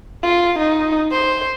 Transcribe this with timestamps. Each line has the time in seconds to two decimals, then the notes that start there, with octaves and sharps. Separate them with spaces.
0.23 F4
0.59 D#4
1.12 C5